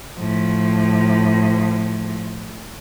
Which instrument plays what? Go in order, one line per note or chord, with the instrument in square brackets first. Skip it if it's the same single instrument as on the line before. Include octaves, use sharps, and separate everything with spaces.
[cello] A2 F3